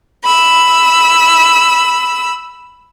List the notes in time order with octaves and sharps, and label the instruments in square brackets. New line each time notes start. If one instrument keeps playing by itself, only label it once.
[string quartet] B5 E6